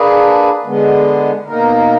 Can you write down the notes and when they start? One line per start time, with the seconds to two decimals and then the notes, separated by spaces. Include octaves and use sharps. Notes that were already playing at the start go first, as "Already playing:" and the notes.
Already playing: A#3 D4 G#4 B4
0.66 D3 G#3 B3
1.47 B2 A#3 D#4 A#4